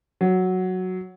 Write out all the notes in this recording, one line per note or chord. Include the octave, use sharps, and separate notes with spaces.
F#3